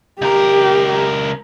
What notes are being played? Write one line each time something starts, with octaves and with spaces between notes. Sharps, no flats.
C#2 G4 A#4